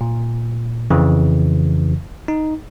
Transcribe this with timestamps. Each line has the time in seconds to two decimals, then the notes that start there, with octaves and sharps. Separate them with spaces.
0.01 A#2
0.90 F2 C#3 E3
2.28 D#4